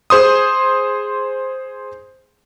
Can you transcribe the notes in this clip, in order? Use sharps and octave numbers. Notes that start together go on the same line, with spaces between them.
G#4 C5 C6 D#6